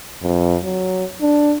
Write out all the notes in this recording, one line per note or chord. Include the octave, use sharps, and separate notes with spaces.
F2
F#3
D4